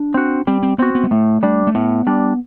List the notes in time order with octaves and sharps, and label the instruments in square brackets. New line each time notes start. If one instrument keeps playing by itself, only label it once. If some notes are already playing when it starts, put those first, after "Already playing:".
Already playing: [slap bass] D4
[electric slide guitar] C4 F#4
[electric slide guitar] G3 [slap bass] C4
[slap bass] C4
[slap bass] B3 [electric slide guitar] C4 F#4
[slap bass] B3
G3
[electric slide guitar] A2 [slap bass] A3
[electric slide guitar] G3 D4
[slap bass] A3
[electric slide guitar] A2 [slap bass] B3
[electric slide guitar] G3 D4